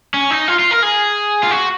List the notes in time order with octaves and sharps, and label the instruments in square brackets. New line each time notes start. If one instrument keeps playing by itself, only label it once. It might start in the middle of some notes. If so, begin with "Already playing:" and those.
[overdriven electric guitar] C#4
D#4
F4
F4
A#4
G#4
F4
F#4